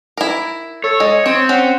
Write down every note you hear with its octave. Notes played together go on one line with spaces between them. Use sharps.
E4 A#4
A4 C#5
G#3 D#5
C4 C#5
C#4 F#5